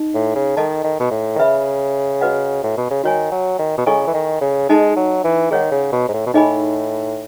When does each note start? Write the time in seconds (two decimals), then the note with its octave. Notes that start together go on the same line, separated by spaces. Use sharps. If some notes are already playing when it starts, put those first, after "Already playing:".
Already playing: D#4 D#5
0.15 A2
0.35 C#3
0.57 D#3 A4 D#5 A5
0.84 D#3
1.00 B2
1.11 A2
1.35 D#3
1.38 C#3 B4 E5 B5
2.21 F#4 B4 D#5 F#5
2.63 A2
2.77 B2
2.91 C#3
3.04 D#3 F#4 C#5 G#5
3.31 F#3
3.59 D#3
3.78 B2
3.86 C#3 E4 A4 D#5 G#5 C#6
4.07 E3
4.14 D#3
4.41 C#3
4.69 G#3 D#4 A4 D#5 A5
4.96 F#3
5.24 E3
5.51 D#3 G#4 C#5 F#5
5.72 C#3
5.92 B2
6.09 G#2
6.13 A2
6.26 B2
6.34 A2 D#4 G#4 D#5 G#5 B5